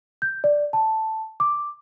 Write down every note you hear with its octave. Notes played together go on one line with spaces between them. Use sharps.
G6
D5
A5
D6